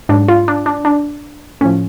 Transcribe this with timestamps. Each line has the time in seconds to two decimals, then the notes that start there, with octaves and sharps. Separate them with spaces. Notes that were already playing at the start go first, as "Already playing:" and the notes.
0.09 G#2 F#3 D4
0.28 F4
0.48 D4
0.66 D4
0.85 D4
1.61 A2 F3 C#4